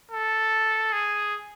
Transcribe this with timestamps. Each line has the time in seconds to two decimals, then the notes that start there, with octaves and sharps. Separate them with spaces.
0.12 A4
0.93 G#4